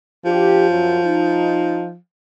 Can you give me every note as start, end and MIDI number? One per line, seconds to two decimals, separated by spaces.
0.25 1.96 53
0.25 0.67 62
0.25 0.67 67
0.69 0.98 42
0.69 0.98 54
1.04 1.88 63